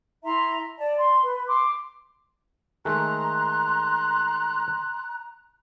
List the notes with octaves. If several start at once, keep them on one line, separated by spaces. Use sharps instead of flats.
E4 E5 A#5 C6
D5 A5
C6
B4
C6 D6
D#3 G#3 A3 A#5 C6 F#6